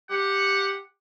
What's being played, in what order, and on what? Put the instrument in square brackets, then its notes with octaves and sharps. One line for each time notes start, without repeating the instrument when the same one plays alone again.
[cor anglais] G4 [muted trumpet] F#5